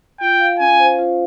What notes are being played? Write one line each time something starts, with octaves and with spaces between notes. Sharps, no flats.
F4 G5
F5
C#4 G#5
C5
F4